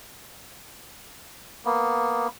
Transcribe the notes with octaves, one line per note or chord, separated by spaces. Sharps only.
A#3 B3